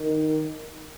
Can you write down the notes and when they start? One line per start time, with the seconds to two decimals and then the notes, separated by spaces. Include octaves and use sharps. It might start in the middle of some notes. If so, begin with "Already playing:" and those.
Already playing: D#3